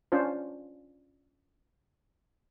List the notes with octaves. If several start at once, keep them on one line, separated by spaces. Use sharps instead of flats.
C#4 D4 F4 C5